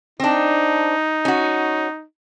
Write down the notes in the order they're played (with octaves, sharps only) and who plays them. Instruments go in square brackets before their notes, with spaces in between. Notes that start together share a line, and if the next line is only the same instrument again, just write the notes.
[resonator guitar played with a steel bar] C4 D4 [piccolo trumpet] D#4
[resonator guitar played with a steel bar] C#4 F#4